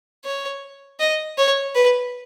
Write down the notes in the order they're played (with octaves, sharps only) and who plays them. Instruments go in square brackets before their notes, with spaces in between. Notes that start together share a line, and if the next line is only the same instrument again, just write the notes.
[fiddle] C#5
D#5
C#5
B4